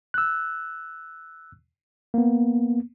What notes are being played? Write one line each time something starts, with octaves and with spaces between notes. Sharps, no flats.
E6 F#6
A#3 B3